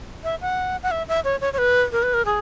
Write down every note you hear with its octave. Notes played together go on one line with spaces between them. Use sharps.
E5
F#5
F#5
E5
E5
C#5
C#5
C#5
B4
A#4
B4
A#4
G#4